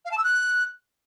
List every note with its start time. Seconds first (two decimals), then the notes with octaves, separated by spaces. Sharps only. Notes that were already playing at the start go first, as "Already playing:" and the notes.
0.05 F5
0.11 A5
0.18 E6
0.24 F#6